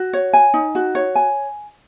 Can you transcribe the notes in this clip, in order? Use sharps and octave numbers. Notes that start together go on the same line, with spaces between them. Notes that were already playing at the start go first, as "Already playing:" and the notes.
Already playing: F#4
C#5
G#5
D#4
F#4
C#5
G#5